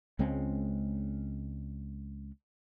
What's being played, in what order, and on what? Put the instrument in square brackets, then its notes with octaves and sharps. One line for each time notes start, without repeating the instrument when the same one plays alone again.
[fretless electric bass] C#2 G#3 C4 C#4